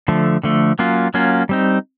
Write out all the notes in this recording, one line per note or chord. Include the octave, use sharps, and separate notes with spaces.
D3 F3 A3
D3 F3 A3
F#3 A#3 C#4 F4
F#3 A#3 C#4 F4
G3 C4 D#4